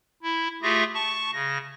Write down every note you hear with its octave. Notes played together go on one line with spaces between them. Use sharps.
E4
A3 F4 G4 G#4 E5 A#6
A5 C#6
C#3 A#6